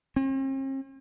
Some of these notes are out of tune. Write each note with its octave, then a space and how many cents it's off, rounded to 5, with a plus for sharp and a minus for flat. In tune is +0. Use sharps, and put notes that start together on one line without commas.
C4 +45